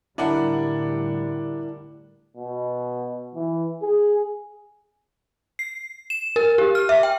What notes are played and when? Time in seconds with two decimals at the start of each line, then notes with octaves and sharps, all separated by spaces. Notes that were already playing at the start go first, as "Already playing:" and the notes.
0.18 A2 D3 G3 D4 E4 A#4 D5 F#5
2.37 B2
3.35 E3
3.82 G#4
5.59 C7
6.10 E7
6.36 A#4
6.58 G4
6.75 F6
6.89 E5
7.03 G5